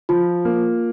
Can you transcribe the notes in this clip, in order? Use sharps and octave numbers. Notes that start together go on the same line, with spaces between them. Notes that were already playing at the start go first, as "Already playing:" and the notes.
F3 F4
A#3